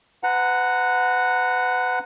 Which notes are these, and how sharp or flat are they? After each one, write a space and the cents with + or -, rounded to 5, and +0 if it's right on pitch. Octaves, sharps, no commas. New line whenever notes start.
B4 +35 F#5 +0 A#5 -20